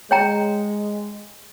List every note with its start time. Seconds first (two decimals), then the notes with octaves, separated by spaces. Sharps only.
0.11 G#3 C#5 G5 A#5